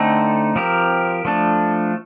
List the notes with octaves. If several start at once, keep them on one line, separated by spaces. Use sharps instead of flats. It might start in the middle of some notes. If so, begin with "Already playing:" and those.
Already playing: D3 A3 C4 D#4 A4
F3 C4 G4 A#4
F3 A3 D4 A4